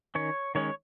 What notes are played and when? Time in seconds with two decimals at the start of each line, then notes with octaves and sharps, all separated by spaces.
0.15 D#3 C#4 C#5
0.55 D#3 G#3 C#4 C#5